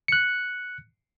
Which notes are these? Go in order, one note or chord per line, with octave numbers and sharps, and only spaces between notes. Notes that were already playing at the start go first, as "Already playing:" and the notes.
F#6 C#7